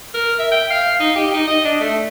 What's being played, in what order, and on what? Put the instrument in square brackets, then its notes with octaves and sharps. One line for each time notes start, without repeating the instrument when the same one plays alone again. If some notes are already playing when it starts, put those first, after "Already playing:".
[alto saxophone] A#4
E5
G5
F5
D#4
G4
D#4
D#5
D4
A3